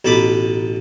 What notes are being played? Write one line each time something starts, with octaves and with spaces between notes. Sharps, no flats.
A1 B2 D#4 A4 B5 D6